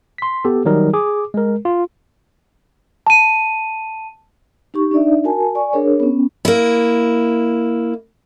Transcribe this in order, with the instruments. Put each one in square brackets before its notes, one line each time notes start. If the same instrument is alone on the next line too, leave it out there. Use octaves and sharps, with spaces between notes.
[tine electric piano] C6 B6
B3 G4 A4
D#3 F#3 G3 D#4 A#4
G#4 D6
G#3 A#4
F4
[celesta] A5 D#7
[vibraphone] D#4 G4 C#6
D4 D#4 D5 E5
F#4 A#4 G#5 A5
D5 G#5 C#6
D4 G#4 A#4 C#5
B3 C#4
[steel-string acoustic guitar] A#3 E4